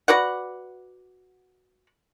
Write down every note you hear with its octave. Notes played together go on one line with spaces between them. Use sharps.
F#4 B4 D5 F#5